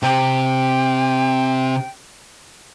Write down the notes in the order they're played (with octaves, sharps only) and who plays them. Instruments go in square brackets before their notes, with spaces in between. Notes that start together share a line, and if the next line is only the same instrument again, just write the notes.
[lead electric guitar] C3 C4 [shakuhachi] G5